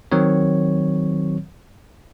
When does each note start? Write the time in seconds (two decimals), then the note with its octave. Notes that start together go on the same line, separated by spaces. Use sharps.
0.12 D#3 F#3 C4 C#5